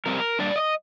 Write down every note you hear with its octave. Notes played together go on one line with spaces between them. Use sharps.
F2 C3 G3 C4 A#4
A#2 G3 D4 D5
D#5